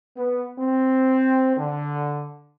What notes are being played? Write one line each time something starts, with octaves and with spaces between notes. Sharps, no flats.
B3
C4
D3